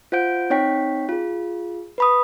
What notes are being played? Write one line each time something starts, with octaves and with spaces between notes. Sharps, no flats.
F4 C5 F#5 G6 D7
C4 D#4 C#5 G5 B6
F4 G#4
B4 B5 D#6